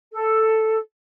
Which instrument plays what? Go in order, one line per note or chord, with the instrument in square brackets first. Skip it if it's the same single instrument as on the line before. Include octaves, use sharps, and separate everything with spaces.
[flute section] A4